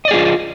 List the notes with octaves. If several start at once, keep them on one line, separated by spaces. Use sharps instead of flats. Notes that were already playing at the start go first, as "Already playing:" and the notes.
F4 G#4 D5 D#5